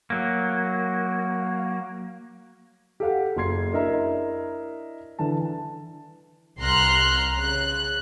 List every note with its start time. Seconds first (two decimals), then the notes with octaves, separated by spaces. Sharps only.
0.10 F#3 A#3
3.00 G4 A4 F5 F#5
3.37 F#1 F#4 C6 G#6 C7
3.73 D4 E4 A#4 D#5 E5 A#5
5.19 D3 E3 A5
6.58 C2 A#5 C6 F6 F#6
7.36 C#3 F#6